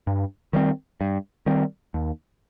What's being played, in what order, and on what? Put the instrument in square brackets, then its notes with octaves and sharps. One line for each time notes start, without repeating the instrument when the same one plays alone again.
[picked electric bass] G2
D#3 G3 C4
G2
D#3 G3 C4
D#2